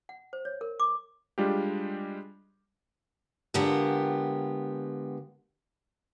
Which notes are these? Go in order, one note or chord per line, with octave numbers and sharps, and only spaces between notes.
F#5
C5
C#5
A#4
D6
G3 G#3 D4 F4 G4
D3 G#3 B3 F4 G4 A#4